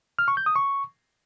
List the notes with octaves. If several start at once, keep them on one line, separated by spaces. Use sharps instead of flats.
F6
C#6
G6
D#6
C#6